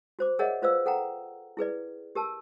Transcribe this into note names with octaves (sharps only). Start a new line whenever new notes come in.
F#4 C5 D6
G#4 A#4 C#5 D#5 E5 F#5
F4 B4 C5 D5 F5 E6
A4 F#5 G5 A#5
E4 G#4 B4 D5
G4 A#4 A5 E6